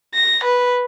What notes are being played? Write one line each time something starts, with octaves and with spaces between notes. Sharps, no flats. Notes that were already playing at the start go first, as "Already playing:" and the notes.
A#6
B4